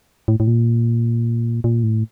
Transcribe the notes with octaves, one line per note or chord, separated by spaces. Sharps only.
A2
A2
A#2
A#2
A2